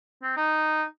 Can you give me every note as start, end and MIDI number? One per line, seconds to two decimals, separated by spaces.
0.23 0.34 60
0.37 0.84 63